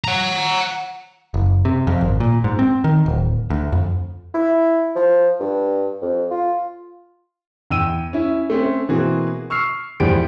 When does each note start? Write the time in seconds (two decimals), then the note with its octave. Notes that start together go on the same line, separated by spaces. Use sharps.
0.04 F#5 A#5
1.34 F#1
1.65 C3
1.87 F2
2.01 G#1
2.20 A#2
2.44 G#2
2.59 C4
2.84 D#3
3.06 D1
3.50 D2
3.72 F2
4.34 E4
4.95 F3
5.40 G2
6.02 F2
6.31 F4
7.70 E2 G5 E6 D#7
8.13 C#4 E4
8.50 A3 C4 C#4
8.89 B2 E3 A#3 C4 F#4 G#4
9.50 C#6 E6 F6 C7
10.00 E2 A2 F3 G3 G4 D7